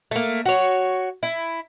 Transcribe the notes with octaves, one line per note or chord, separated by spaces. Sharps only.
A3 A#3
F#4 C#5
E4